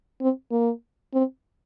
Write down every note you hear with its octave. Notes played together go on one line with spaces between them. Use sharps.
C4
A#3
C4